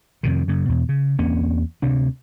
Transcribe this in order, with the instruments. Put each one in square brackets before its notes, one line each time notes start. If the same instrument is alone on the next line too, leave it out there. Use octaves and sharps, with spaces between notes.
[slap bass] F2 C3 D#3
F#2 C#3
E2 B2
C#3
E2 A#3 C4 C#4
D2 C3 D4